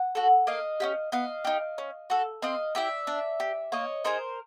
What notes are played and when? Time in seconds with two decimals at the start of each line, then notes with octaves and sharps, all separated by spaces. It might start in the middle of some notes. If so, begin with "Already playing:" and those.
Already playing: F#5
0.15 F#4 A4
0.47 A#3 D#5 F5
0.80 C#4 E4 G4
1.12 B3 D#5 F5
1.45 D#4 G4
1.78 C#4
2.10 F#4 A4
2.42 C4 D#5 F5
2.75 E4 G4 D5 E5
3.07 D4
3.40 G4
3.72 A#3 C#5 D#5
4.05 D#4 G#4 A#4 C5